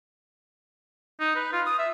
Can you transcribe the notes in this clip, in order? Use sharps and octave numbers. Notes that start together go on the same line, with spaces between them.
D#4
B4
F4
D#6
E5